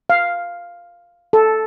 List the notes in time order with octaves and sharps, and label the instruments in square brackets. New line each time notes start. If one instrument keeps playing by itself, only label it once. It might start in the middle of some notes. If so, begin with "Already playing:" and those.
[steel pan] F5
A4